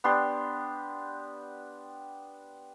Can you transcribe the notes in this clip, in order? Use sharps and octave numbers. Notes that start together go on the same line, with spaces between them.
B3 D4 G4 C6